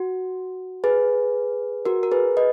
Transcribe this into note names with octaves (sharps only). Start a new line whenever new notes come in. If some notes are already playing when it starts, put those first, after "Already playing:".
Already playing: F#4
G#4 B4
F#4 A#4
A#4
G#4 B4
B4 D#5